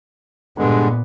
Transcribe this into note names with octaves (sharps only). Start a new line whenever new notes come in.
G2 A#2 D3 G#3 B3